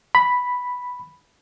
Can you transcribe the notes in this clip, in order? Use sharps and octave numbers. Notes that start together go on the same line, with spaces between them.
B5